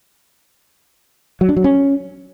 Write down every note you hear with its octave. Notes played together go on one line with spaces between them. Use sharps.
F#3
D4
F#3
C#4